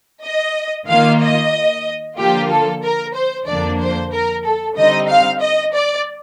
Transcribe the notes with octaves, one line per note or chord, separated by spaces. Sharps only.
D#5
D#3 A#3 F4 F5
D#5
D3 F3 A#3 F4 G4
A4
A#4
C5
F2 D3 F3 A#3 D4 D5
C5
A#4
A4
D3 G3 C4 D#4 D#5
F5
D#5
D5